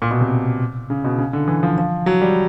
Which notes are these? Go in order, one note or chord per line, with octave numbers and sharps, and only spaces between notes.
A#2
B2
C3
C#3
B2
C#3
D3
E3
F3
F3
F#3
G3